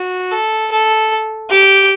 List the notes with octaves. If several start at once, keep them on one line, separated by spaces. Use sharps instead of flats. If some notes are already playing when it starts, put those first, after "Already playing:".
Already playing: F#4
A4
A4
G4